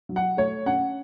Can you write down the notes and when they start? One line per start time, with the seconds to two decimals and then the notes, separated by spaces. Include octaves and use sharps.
0.09 F#3
0.16 F#5
0.37 A3 C#5
0.66 C#4 F#5